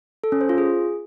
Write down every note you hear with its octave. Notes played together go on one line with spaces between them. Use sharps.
A4
C#4
C5
F4
G#4